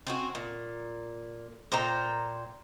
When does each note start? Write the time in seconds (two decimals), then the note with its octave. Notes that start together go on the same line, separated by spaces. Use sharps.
0.07 C4 C#4 F#4
0.35 A#2
1.72 A#2 C5 G5 A#5